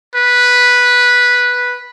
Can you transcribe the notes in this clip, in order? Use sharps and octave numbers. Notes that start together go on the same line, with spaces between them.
B4